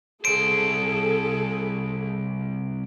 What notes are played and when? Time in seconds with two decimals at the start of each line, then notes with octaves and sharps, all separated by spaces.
0.25 C2 G#4 A4 C5 D7